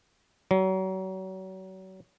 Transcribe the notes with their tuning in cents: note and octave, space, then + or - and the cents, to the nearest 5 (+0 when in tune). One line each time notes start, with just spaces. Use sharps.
F#3 +35